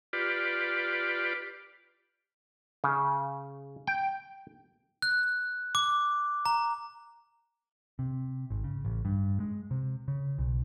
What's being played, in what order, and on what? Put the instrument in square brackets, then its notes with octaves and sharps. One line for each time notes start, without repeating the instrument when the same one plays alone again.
[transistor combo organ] F4 G4 B4 D5
[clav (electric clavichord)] C#3
G5
[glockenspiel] F#6
D6
A#5
[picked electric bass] C3
G#1
C#3
A1
G2
G#3
C3
C#3
B1